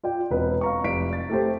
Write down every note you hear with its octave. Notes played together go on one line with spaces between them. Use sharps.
F4 D5 G5
E1 C4 B4 D#5
F5 A#5 C#6
F1 D5 B6 D7
A6
A3 G4 C5